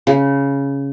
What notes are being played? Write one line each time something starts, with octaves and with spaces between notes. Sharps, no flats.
C#3